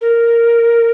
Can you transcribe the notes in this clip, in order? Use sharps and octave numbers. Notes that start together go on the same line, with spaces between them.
A#4